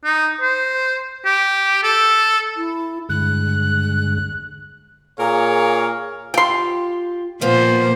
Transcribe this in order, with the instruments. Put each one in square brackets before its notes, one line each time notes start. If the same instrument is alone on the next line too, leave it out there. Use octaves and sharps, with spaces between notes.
[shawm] D#4
C5
G4
A4
[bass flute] E4
[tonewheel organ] G2 D3 G#3 [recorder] F#6
[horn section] A#2 G#4 A#4 C#5 F5
[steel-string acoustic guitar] F4 G4 [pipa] G5 C6
[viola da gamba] A#2 A#3 C5 [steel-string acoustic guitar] F3 B3